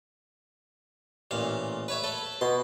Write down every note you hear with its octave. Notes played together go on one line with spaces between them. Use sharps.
A1 A#2 F5
B4 C#5 E5
A4 B4
B2 C6